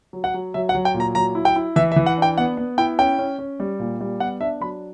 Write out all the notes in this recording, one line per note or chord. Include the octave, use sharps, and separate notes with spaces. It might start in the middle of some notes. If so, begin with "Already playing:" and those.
F#3
F#5
F#3
F#3 E5
F#5
F#3
G5
A#2
A#5
F#3 A#5
E4
G5
E4
E3 E5
E5
E3
F#5
D4 G5
B3 F#5
B3
E4 G5
C#4 G5
C#4
C#4
G3
A#2
G3
B3 F#5
D4 E5
F#3 B5